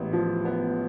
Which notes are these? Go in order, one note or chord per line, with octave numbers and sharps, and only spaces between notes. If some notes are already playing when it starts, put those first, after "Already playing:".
Already playing: A1 G#2 B3
F3
B3